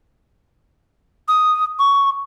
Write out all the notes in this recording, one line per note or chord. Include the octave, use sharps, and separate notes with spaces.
D#6
C#6